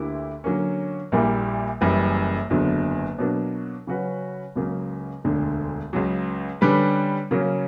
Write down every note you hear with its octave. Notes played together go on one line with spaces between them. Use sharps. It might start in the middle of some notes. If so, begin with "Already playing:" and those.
Already playing: D2 D3 A#3 E4 G4
D3 F#3 A#3 C#4
A#1 A#2 G3 A#3 E4
F#1 F#2 E3 G3
F#1 E2 D3 F#3
B2 F#3 A#3 D4
C#3 F#3 C#4 F#4 B4
C#2 C#3 F#3 A#3
E1 D2 D3
C#2 C#3 F#3
D3 G3 C#4 G4 B4
C#3 F#3 A#3 C#4